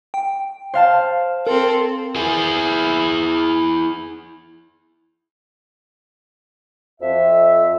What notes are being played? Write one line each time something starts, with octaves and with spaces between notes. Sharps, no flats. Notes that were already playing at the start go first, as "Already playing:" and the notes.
G5
C5 F5 A5
C4 A4 A#4
E4 G#4
F2 E5